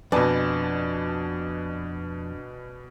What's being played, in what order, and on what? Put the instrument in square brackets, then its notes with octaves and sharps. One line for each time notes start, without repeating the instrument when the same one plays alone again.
[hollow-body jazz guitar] F2 [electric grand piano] B2 D5 [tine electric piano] D4 [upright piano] B4 G#5 A5